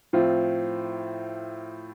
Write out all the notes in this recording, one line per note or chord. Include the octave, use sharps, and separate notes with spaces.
A2 F3 C4 F4